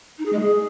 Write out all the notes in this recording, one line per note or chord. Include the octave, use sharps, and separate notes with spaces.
D#4
G#4
G#3
G#4